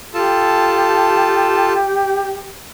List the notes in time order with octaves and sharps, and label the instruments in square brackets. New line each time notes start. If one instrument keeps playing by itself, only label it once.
[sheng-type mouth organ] F4 A4 A5 [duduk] G4